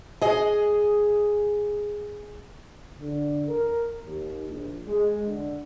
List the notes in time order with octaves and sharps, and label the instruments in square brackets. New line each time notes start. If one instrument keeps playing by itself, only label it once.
[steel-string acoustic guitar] G#4 D#5
[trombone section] D3
A#4
D#2
A#1
G#3
D3